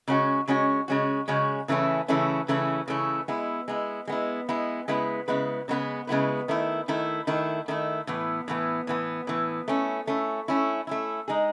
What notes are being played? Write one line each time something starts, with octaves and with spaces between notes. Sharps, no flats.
C#3 G#3 C#4 F#4
C#3 G#3 C#4 F#4
C#3 G#3 C#4 F#4
C#3 G#3 C#4 F#4
C#3 E3 A3 C#4 E4
C#3 E3 A3 C#4 E4
C#3 E3 A3 C#4 E4
C#3 E3 A3 C#4 E4
G#3 B3 E4
G#3 B3 E4
G#3 B3 E4
G#3 B3 E4
C#3 G#3 B3 E4 B4
C#3 G#3 B3 E4 B4
C#3 G#3 B3 E4 B4
C#3 G#3 B3 E4 B4
D#3 A3 E4
D#3 A3 E4
D#3 A3 E4
D#3 A3 E4
A2 E3 B3
A2 E3 B3
A2 E3 B3
A2 E3 B3
A3 C#4 E4
A3 C#4 E4
A3 C#4 E4
A3 C#4 E4
G#3 D#4 G#4